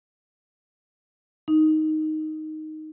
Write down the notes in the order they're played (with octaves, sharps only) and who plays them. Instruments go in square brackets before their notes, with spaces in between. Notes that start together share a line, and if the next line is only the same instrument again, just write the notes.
[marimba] D#4